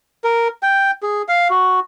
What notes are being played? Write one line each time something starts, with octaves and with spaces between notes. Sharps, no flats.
A#4
G5
G#4
F5
F#4